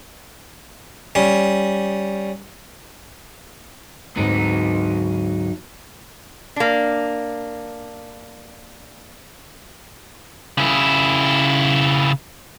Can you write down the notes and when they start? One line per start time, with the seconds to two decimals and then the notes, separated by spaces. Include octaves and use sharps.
1.15 G3 C#4
4.17 D2 G#2 F#3 C4 D#4
6.56 A#3 D4
10.58 C#3 E4